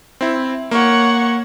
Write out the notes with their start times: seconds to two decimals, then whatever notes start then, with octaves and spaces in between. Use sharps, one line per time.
0.21 C4 E4
0.71 A#3 C#5 F#5 C#6